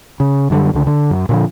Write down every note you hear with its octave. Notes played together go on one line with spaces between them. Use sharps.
C#3
F#2 D3 G3
C#2 D3
D3
F#2
A#2 D3 F3